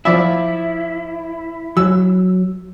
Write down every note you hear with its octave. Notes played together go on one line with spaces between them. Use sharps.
F3 E4 D5 E5
F#3 E6